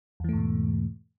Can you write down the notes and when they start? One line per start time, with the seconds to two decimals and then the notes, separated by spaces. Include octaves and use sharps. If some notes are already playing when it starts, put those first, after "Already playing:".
0.20 E2
0.24 E3
0.29 A3
0.33 G#2
0.37 B2